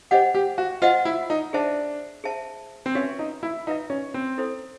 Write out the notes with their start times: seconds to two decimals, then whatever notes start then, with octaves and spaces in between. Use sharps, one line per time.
0.11 G4 C5 D#5 F#5
0.35 G4
0.58 F#4
0.82 F4 C5 D#5 F#5
1.05 E4
1.30 D#4
1.53 D4 G#4 C5 E5 A5
2.24 G#4 C5 E5 A5
2.86 C4
2.95 C#4 F#4 B4 E5
3.19 D#4
3.43 E4
3.67 D#4 F#4 B4 E5
3.90 C#4
4.14 C4
4.38 E4 A4 C5